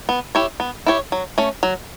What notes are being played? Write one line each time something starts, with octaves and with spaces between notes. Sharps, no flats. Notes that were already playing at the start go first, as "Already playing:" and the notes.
B3
E4 G4 C#5
B3
E4 G4 C#5
F#3
A3 C#4
F#3